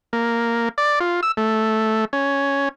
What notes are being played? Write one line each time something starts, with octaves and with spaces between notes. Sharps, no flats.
A#3
D5
F4
E6
A3
C#4